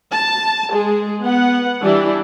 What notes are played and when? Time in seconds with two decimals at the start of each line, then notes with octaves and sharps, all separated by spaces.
0.11 A5
0.71 G#3 G#4
1.23 B3 F#5
1.81 E3 G3 D4 E4